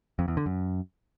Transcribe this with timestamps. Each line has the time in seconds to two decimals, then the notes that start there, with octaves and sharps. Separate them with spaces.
0.19 F2
0.28 E2
0.37 D3
0.46 F#2